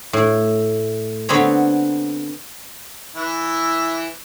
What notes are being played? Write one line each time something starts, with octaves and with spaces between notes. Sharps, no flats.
A2
D3 B3 C4 B4 C#5
E3 E4